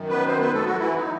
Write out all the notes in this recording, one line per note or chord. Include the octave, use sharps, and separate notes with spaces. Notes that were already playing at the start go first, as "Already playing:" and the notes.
Already playing: F#2 D#3
B3 B4
C4 C5
B3 B4
A3 A4
F#3 F#4
E3 E4
D#4